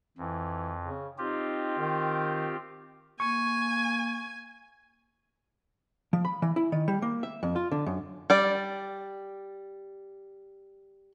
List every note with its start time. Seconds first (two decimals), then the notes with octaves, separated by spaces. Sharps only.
0.18 F2 E3
0.83 C#3
1.18 C4 D#4 F4 G4
1.79 D#3
3.20 A#3 G#5 C#6
6.13 F3
6.25 B5
6.42 E3
6.56 E4
6.72 D#3
6.88 G3
7.02 A#3
7.23 E5
7.43 F2
7.56 F4
7.72 D3
7.86 F#2
8.30 G3 D5